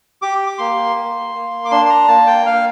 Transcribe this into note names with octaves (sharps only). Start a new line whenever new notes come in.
G4 D6
D6
A#3 C6
A#3
A#3
D6
D4 C6
C6
A#5
A#3 A5
G5
A#3 F5